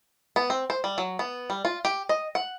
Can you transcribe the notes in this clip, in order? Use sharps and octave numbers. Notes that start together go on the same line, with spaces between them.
B3
C4
C5
G3
F#3
B3
G3
F4
G4
D#5
F#5